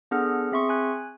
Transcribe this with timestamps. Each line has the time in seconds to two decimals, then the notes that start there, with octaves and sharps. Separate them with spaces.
0.11 B3 D4 G#4 A4 F#5 F6
0.52 C4 G#4 E5 C6 C#6
0.69 G#5 F#6